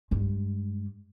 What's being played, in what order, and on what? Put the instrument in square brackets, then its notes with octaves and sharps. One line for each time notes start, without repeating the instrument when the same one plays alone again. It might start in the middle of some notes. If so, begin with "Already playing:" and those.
[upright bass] G2 G#3